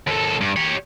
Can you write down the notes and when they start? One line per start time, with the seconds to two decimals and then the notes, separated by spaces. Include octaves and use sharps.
0.07 D#2 A4
0.41 G2
0.57 G4 C#5